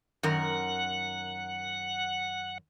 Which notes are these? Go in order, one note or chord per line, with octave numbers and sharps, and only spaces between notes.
F#2 D#3 A#4 F#5